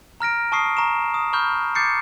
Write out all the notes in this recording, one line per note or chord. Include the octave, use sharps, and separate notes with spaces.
A#5 F6 A#6 D7
A5 C#6 D#6 C7
A#5 C#6 E7
D#6
B5 C#6 F6 G6
D6 G6 A6 C7 C#7